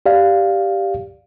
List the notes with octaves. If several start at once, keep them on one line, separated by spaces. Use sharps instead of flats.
G4 D5 F5